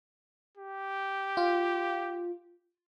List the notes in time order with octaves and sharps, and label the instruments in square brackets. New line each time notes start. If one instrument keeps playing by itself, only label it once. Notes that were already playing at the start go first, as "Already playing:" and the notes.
[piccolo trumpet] G4
[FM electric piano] F4